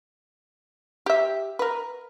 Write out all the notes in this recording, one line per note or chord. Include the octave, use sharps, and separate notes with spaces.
G4 E5
A#4 B4